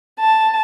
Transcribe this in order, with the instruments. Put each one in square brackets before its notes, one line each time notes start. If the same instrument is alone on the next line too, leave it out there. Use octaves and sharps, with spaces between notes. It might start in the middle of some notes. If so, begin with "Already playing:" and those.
[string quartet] A5